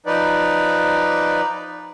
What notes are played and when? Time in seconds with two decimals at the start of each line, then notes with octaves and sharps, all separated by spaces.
0.06 F3 D#4 B4 D5